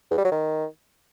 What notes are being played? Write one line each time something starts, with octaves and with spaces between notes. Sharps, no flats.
E2
G3
F#3
D#3